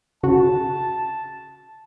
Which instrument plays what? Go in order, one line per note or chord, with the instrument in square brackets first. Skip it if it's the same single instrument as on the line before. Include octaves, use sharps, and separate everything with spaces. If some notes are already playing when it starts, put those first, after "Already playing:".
[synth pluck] C#3 F#4 [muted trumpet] A5